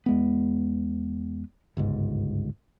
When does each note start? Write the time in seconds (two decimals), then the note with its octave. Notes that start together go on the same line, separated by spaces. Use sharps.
0.06 E2 G#3 B3
1.77 G1 C#2 G#2